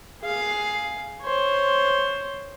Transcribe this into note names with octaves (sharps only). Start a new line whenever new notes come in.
G#4 F5
C5 C#5